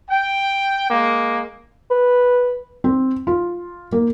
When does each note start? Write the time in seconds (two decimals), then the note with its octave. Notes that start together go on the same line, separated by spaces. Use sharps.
0.11 G5
0.90 G#3 A#3
1.90 B4
2.84 C4
3.27 F4
3.93 A#3